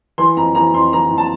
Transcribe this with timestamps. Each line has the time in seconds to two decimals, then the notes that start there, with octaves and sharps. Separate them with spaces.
0.18 E3 C6
0.37 F2 A#5
0.55 E3 A#5
0.73 F2 C6
0.93 E3 A#5
1.11 F2
1.18 A5